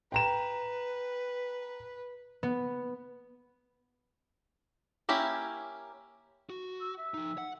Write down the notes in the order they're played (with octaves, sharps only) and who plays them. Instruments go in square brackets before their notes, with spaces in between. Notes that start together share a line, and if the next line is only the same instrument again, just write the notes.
[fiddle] B4 [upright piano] G5 A#5 E7
[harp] B3
[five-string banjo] A#3 C#4 E4 G4
[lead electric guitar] F#4
[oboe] E6
E5
[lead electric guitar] F3 D#4
F#5